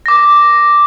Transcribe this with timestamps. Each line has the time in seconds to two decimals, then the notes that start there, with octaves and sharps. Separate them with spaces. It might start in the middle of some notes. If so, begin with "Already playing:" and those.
0.06 D6 A#6